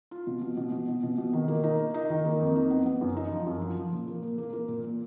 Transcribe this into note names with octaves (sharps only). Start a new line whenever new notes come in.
F4
B2
B2
B2
B2
B2
B2
B2
D#3
A#3
D#4
A#3
D#4
D#3
A#3
F2
D#4
B3
B3
F#2
D#4
F3
F#2
F3
F3
A#2
A#3
A#2
A#3
A#3
A#2
A#2